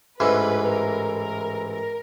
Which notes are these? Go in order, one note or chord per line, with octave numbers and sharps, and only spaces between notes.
A1 G#2 E3 B4
A#4
A#4
A#4